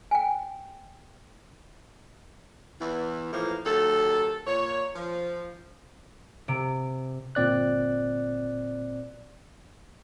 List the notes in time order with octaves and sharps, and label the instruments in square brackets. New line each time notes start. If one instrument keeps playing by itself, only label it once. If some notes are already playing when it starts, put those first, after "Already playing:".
[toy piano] G5 G#5
[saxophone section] E2 E3
A2 E3 F3 A#3
D#2 F#3 A4
A#2 C#5
F3
[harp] C3 D7
[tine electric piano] G1 A#2 C4 D5 F#6